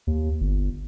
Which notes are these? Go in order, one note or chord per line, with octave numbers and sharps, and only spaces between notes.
D#2
G1